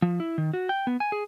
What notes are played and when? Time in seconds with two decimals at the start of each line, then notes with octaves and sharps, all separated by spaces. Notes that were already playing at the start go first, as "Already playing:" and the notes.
0.02 F3
0.20 E4
0.38 D#3
0.53 F#4
0.69 G5
0.87 B3
1.00 G#5
1.12 G#4